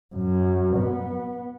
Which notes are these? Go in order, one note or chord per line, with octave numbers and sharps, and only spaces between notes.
F#2
B3